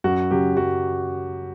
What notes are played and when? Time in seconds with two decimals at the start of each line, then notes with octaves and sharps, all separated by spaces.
0.04 F#2 F#4
0.31 C#3 F#3 G4
0.57 F#2 F#4